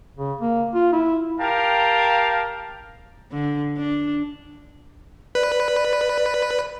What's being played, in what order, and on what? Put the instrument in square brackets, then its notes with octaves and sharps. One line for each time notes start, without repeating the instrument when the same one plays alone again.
[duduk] C#3
A#3
F4
E4
[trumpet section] G4 A#4 F5 G5 A5
[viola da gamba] D3
D4
[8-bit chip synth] B4 [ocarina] D5